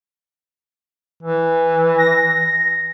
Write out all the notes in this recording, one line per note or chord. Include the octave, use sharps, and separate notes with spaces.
E3
A#6